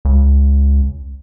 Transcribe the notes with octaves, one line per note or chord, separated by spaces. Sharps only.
C#2